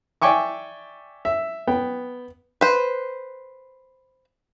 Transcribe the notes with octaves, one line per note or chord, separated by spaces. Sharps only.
D5 E5 G5 G#5 C#6 D6
E5
B3 G5
B4 C5